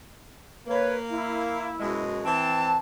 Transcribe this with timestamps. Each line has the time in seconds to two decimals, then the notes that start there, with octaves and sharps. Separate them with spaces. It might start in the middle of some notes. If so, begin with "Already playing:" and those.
0.67 A#3 B4 C#5
1.10 E4
1.79 F#2 B2 G#3
2.24 E3 C4 A5